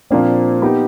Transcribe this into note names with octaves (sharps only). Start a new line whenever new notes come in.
A#2 F3 A#3 C4 D4
B3 D#4 G4